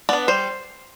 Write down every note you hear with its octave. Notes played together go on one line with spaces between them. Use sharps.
B3 D4 D5
G3 C5